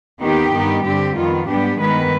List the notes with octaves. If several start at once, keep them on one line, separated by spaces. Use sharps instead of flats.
D#2 D#3 B3 D#4 G4
G2 D#3 B3 D#4
G2 D3 G3 C4 G4
F2 D#3 B3 F4
G#2 G3 B3 D4 G4
G2 D#3 G#3 B3 B4